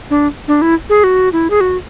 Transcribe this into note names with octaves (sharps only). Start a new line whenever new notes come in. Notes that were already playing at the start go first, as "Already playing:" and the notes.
D4
D4
E4
G#4
F#4
E4
G#4
F#4